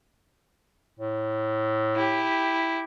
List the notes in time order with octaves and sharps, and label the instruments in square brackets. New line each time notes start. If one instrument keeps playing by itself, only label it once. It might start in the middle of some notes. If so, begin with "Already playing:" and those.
[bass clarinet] A2
[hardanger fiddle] E4 G4